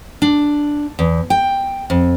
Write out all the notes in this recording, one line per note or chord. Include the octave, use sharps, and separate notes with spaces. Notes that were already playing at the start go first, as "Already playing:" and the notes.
D4
E2
G5
F2